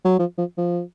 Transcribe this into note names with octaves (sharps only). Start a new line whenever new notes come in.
F#3
F3
F3
F3